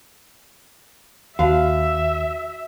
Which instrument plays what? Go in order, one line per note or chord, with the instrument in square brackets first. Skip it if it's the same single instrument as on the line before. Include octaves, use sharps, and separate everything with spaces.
[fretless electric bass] D#2 [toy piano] F#4 C5 A5 [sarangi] E5 [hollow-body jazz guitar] F5